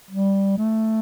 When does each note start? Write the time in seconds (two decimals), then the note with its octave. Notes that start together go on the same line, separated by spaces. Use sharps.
0.11 G3
0.58 A3